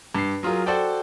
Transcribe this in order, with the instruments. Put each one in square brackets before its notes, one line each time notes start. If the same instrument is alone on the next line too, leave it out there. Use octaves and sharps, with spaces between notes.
[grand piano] G2 C7
F#3 F4 G#4 A#4
F#4 A4 C5 D5 G5